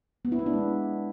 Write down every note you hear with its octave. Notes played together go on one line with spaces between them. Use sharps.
B3
E4
B3
D4
G#3